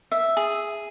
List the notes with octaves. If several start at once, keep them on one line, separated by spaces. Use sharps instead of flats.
E5
G#4